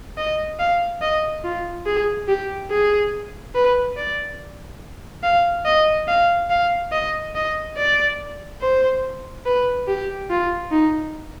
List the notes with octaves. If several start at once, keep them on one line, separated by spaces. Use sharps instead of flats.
D#5
F5
D#5
F4
G#4
G4
G#4
B4
D5
F5
D#5
F5
F5
D#5
D#5
D5
C5
B4
G4
F4
D#4